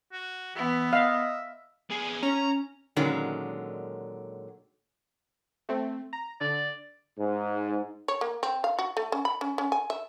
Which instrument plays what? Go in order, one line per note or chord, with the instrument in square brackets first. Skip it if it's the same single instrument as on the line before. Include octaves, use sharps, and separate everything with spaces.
[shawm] F#4
[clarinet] E3 [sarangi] B3 [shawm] E5
[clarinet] D#5 [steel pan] F5
[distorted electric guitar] B3 G#4
[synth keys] C#4 [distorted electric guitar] A#5
[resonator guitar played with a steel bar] A#2 D3 D#3 F#3 G#3 C#4
[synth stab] A3 C4
A#5
[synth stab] D3 [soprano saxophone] D5
[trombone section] G#2
[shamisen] C#5
A#3
C4
F5
F#4
A3
C#4
B5
C#4
C#4
G#5
E5